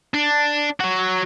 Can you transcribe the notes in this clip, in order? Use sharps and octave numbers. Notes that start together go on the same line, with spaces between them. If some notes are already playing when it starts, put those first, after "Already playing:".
D4
F#3 F#4